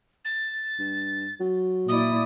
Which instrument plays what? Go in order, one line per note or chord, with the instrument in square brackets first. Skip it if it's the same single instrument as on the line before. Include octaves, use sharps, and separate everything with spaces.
[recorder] A6
[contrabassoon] G2
F#3
[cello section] A#2 E4 D5 [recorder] D#6